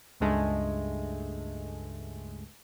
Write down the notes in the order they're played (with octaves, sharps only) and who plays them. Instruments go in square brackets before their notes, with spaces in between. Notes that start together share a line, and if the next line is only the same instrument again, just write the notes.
[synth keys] C#2 G2 G#3 A3